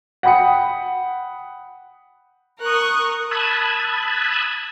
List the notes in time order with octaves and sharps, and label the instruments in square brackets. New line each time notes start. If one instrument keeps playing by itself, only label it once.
[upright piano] F#5 G5 B5 D#6 C#7
[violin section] A#4 C#6 [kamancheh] D#6 F#6
[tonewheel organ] A5 B5 D#6 E6 F#6 G#6